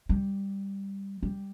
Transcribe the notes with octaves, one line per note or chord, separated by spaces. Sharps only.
G3
G3